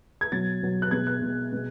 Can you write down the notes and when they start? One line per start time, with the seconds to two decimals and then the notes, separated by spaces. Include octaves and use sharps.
0.21 G#6
0.32 B2 F#3 A6
0.62 B2 F#3
0.82 F#6
0.91 B2 G#3 G#6
1.07 F#6
1.22 B2 G#3
1.53 B2 G#3